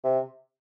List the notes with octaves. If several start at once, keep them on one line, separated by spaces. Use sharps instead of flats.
C3